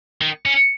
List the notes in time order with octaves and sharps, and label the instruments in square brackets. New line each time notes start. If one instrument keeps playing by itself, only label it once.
[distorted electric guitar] D#3
C#4